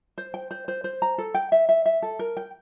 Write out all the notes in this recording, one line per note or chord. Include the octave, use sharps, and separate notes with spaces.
C5
G5
C5
C5
C5
A#5
A4
G5
E5
E5
E5
A4
A#4
G5